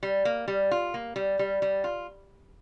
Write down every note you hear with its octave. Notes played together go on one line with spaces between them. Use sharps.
G3
A#3
G3
F4
A#3
G3
G3
G3
F4